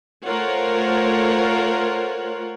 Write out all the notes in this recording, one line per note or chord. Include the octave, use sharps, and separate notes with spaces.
A3 F4 A#4 C5 C#5 F#5